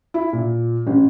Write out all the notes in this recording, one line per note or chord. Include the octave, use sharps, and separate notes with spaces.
E4
A#2
A1